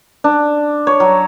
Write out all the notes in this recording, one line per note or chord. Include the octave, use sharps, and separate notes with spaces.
D4
C#5
F#3